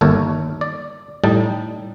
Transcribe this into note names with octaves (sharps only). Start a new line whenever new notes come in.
G1 D#2 A4 A#4 C#5
D5
A2 G3 D#4 A5